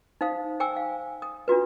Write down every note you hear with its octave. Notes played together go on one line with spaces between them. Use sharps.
D#4 C5 F5 D#6
C5 G5 G#5 D6 E6
F5
D#6
D4 F4 F#4 B4